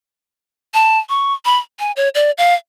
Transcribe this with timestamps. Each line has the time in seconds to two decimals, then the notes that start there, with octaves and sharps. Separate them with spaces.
0.74 A5
1.09 C#6
1.45 B5
1.79 G#5
1.96 C#5
2.15 D5
2.38 F5